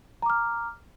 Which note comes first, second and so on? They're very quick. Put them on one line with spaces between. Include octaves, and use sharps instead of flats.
A#5 D6 F6